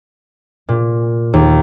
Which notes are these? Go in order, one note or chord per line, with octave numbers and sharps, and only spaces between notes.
A#2
D#2